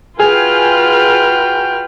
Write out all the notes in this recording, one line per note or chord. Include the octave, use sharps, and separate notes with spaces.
F4 F#4 G#4 B4 G5 F6